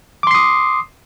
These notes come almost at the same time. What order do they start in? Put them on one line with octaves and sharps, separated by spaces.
D6 C6 C7 D#6